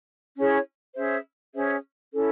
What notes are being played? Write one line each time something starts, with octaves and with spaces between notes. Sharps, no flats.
C#4 E4 G#4 C#5
C#4 G#4 C5 E5
C#4 G#4 C5 E5
C#4 E4 A4